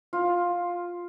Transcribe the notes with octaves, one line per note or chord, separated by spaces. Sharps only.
F4